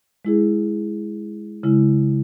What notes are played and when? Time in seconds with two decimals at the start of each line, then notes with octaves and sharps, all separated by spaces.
0.25 G#3 E4 G#4
1.63 C#3 G#3 E4